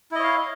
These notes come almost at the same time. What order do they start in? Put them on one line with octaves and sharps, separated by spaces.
E4 D#5 C#5 F5